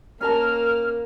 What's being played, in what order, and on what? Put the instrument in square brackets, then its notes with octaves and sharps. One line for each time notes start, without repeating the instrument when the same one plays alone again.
[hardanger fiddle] A#3 [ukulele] C#4 A#4 A5 [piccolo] F6